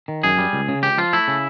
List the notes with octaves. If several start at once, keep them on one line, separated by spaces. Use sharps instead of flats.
D#3
F#2 G#4
G3
C#2
C#3
C#2 G4
F3 F4
A3 E4
C#3